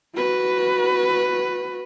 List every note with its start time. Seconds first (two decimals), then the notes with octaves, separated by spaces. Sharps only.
0.17 F#4 B4